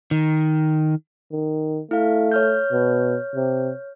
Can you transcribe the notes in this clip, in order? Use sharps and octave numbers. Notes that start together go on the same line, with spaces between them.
D#3
D#3
A3 E4 F5
C#5 F6 G6
B2
C3